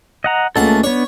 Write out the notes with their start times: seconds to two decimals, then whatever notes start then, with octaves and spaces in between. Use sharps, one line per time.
0.24 D#5 F#5 A#5
0.56 C#2 A3 A#3 A4 F#5
0.84 B3 D4 C#5